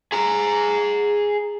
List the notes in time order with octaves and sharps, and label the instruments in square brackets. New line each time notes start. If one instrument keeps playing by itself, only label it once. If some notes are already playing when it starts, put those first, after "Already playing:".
[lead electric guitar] G#4 A#5